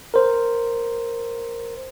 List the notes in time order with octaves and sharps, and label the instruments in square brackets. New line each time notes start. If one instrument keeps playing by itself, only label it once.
[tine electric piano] A#4 C5